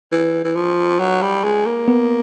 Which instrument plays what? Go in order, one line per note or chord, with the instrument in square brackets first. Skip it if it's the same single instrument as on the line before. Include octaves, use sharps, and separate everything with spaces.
[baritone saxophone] E3
E3
F3
F#3
G3
G#3
A#3
[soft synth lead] B3